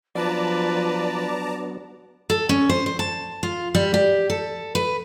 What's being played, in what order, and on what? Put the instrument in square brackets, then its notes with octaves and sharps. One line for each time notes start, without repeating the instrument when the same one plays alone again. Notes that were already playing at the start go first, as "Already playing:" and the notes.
[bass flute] F3 [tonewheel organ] F#3 B3 D4 [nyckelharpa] B4 [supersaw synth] D5 A5 A#5
[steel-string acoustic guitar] A4
C#4
C5
C5
A5
F4
G3
G4
A4
B4